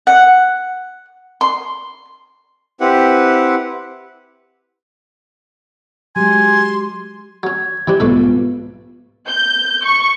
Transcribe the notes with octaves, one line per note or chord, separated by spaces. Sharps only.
F#5
C6
C4 E4 G4 B4 F#5
F#3 G#3 G4 G#5 C6
F#3 C#4 G#6
C3 E3 F3 G3 D4
B1 G#2 G3 A3 B3 D4 F4 A4
G6
C#6